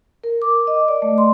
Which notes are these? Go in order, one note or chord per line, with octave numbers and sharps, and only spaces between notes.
A#4
D6
D#5
D5
A3
C6